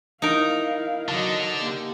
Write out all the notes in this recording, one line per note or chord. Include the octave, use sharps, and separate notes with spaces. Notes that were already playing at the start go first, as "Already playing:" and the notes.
D#4 E4 A#4 F5
D3 F#3 D#5
A#3 G4